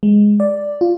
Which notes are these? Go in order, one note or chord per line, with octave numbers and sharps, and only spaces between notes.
G#3
D5
F4